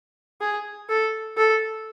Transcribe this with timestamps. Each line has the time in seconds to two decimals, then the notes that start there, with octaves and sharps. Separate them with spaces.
0.41 G#4
0.89 A4
1.37 A4